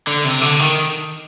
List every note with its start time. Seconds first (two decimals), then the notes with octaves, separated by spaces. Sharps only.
0.07 D3
0.24 C3
0.42 D3
0.59 D#3